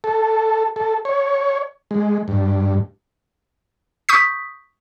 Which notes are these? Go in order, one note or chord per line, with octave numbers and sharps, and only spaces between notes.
A4
A4
C#5
G#3
G2
C#6 D#6 G6 B6